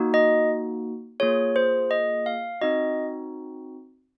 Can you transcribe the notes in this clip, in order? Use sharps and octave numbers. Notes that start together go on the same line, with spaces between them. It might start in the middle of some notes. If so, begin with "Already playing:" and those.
Already playing: A#3 D#4 F#4
D#5
A#3 F4 G#4 C#5
C5
D#5
F5
C4 D#4 F#4 D#5